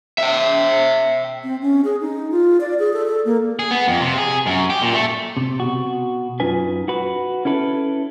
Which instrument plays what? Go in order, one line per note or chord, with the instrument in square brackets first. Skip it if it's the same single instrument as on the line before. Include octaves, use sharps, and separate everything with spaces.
[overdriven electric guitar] E5 G5
[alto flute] C4
C#4
G#4
D#4
F4
D5
G#4
A4
A4
A#3
[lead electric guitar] G#4
B3
F2
C3
G#4
F#2
G4
A#2
A3
[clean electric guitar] C3
B2 F#4
F#2 D#4 F4 B4 G#5
F#4 B4
C#4 E4 A4 B4